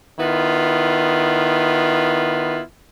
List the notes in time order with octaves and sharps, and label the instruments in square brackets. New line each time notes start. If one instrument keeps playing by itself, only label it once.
[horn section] D#3 B3 E4 F4